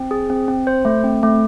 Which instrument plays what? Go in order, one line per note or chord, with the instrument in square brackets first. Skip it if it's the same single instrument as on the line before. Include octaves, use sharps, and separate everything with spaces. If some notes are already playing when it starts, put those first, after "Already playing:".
Already playing: [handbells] C4
G#4
C4
C4
C5
A3
C4
A3